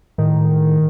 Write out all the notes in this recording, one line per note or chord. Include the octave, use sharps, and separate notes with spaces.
A2 D#3